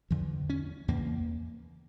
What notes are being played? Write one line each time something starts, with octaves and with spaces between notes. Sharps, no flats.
E2 D3 F3
C#4
E2 C#3 A#3